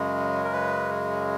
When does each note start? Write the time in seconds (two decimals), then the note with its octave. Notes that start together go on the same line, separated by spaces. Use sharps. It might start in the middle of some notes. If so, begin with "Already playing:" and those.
Already playing: F#2 C#3 G#3
0.44 A#4
0.53 B4